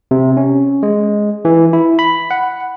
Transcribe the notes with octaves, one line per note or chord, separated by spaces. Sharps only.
C3
C#4
G#3
E3
E4
B5
F#5